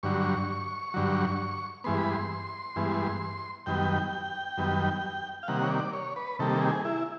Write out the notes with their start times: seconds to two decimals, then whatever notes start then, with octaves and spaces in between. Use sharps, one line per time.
0.03 G2 D3 F#3 C#6
0.94 G2 D3 F#3
1.84 G2 E3 G#3 B3 C6
1.98 B5
2.10 C6
2.76 G2 E3 G#3 B3
3.66 F#2 D#3 G3 B3 G5
4.57 F#2 D#3 G3 B3
5.43 F5
5.48 C3 D#3 G3 A#3 F#5
5.63 C#5
5.71 D5
5.93 C#5
6.16 B4
6.39 C3 D#3 G3 A#3 A4
6.61 G#4
6.85 E4